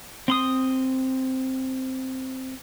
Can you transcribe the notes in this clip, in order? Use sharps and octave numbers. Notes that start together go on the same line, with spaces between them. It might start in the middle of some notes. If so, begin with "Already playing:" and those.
C4 C6 D#6